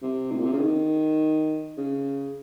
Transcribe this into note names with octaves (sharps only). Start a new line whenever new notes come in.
C3
A2
A#2
C3
C#3
D#3
C#3